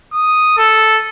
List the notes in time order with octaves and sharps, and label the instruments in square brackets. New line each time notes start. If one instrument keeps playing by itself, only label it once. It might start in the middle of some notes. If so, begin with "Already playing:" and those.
[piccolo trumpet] D#6
A4